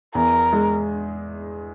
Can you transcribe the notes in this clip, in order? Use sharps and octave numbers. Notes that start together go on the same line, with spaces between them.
E2 A#4
G#3